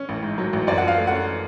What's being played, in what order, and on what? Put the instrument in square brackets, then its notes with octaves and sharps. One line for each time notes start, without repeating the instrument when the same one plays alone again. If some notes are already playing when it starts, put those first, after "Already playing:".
Already playing: [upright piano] C#4
A1
G#2
F#3
A1
F#2 D5
F3 F#5
F5
A3
C#4 F#5